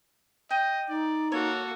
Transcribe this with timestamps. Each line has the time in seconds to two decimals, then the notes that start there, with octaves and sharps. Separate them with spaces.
0.51 D#5 G5
0.89 D#4 D5
1.32 A#3 F#4 A4 C#5